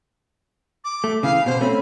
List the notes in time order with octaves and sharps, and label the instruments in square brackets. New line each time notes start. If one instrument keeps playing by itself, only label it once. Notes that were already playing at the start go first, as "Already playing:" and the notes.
[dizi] D6
[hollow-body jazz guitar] A3
[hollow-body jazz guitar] C#3 E3 [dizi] F5
[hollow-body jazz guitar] B2 [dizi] C5
[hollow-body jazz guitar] A3 C4 C#4 [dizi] B5